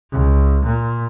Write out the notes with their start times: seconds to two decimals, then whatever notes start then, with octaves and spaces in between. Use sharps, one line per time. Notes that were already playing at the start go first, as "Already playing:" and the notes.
0.12 C#2
0.66 A#2